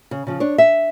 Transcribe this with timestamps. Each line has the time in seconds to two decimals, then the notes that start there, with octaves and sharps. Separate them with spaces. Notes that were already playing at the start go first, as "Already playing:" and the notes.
0.11 C#3
0.27 C#3 F3
0.40 D4 C#5
0.58 E5